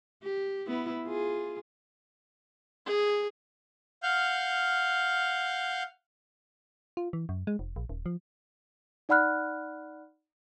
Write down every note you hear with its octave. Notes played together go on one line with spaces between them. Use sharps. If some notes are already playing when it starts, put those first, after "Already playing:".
G4
B3 E4
F4 G#4
G#4
F5 F#5 F6 G6
F4
E3
F#2
G#3
F1
A#1
D#1
F3
D#4 D5 F#5 B5 F6 F#6